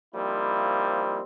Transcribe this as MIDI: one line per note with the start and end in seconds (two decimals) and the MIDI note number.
0.15 1.22 53
0.15 1.22 55
0.15 1.22 58
0.15 1.22 60
0.15 1.22 63
0.15 1.22 64